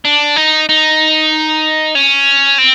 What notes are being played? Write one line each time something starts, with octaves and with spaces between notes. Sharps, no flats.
D4
D#4
D#4
C#4
C4